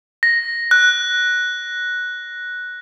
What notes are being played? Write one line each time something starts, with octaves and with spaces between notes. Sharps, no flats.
A#6
F#6